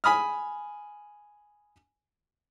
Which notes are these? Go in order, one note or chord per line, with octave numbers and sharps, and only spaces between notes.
G#5 B5 D#6 F6